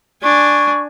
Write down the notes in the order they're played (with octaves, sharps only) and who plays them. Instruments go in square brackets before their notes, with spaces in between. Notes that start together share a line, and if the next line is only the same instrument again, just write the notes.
[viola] D4 G#5 [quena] C#6